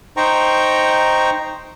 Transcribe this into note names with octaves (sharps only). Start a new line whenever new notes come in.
D#4 C5 G5 A#5 C#6